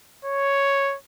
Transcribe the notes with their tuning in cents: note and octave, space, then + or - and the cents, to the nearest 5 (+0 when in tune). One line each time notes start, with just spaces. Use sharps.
C#5 +0